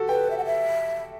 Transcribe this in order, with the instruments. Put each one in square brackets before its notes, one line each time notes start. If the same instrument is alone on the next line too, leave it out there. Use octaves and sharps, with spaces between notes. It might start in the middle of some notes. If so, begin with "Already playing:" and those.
Already playing: [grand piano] F#4 G4 A4
[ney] B4 [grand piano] G5
[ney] E5
F#5
E5